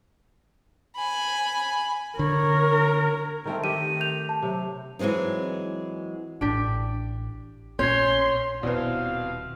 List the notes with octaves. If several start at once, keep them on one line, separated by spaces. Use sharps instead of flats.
G#5 B5
D3 A#4 C#5
D#3 A3 C4 A#4
D#3 G4 E5 G5 D#7
G6 F7
A5
C3 F#3
E3 F#3 G#3 C4 D#4
A1 D4 G4
A#1 C#4 C6 G6 G#6
D#1 B2 C4 E4 B4 C#5 D5 F5